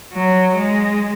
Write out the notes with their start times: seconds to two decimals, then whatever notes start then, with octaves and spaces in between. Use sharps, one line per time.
0.14 F#3
0.57 G#3